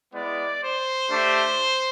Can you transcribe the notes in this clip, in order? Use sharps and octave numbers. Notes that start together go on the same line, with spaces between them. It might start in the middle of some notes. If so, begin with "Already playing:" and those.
G#3 B3 E4 D5
C5
A3 D4 G4